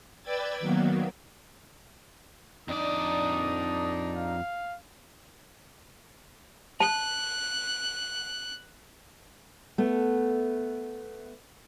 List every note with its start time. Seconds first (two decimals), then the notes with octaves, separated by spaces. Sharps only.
0.22 B4 D5 G5 E6 G#6 A6
0.60 D#3 F#3 A#3 B3
2.68 F2 D4 D#4 D5 D#6
4.16 F5
6.80 A5 F#6
9.78 A3 B3